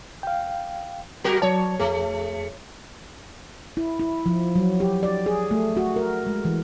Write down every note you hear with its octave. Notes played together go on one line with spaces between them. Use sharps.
F5 G5
F#3 F#4 A#4
F#3 C#5 D5 A5
F2 A3 G#4
E4
E4
F3
F#3
G4
D5
G#4
A3
F#4
A#4
G#3
E3